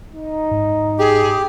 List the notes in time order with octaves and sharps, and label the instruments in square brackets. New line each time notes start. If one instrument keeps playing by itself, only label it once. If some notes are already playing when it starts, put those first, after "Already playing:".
[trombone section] D#4
[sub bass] G#2
[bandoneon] G4 [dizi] G#4